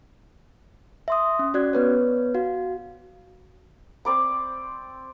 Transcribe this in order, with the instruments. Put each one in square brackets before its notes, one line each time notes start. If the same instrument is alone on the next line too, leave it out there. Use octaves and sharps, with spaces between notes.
[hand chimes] E5 C6 D#6
C#4
C#4 F#4 D5 F#6 G#6
B3 B4 C#5
F#4 F5
[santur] C4 D5 B5